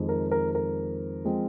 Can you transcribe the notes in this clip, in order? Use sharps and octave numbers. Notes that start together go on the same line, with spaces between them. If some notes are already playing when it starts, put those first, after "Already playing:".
Already playing: F2 D#3 G#3
A#4
A#4
A#4
F3 G#3 C4